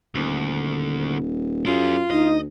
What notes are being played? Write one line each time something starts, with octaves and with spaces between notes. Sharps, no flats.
D#1 D2
F#2 E4 F4 G#4
D2 D#4 D#5